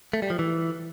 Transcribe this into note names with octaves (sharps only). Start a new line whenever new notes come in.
A3
G3
F3
E3